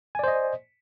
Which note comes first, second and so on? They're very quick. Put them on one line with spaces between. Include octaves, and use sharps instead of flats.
G#5 D5 C5 D#5